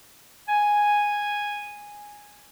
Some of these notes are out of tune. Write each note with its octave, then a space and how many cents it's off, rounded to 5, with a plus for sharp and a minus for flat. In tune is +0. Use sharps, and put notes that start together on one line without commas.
G#5 -5